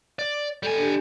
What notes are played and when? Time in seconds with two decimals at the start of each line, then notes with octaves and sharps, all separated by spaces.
0.19 D5
0.63 G3 A4 G#5
0.78 D4 G4